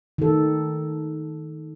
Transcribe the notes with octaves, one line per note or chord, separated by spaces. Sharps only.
D#3 A4